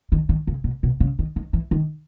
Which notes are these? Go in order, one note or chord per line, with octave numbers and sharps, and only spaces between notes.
D#3
D#3
C#3
B2
B2
C#3
D#3
D#3
E3
D#3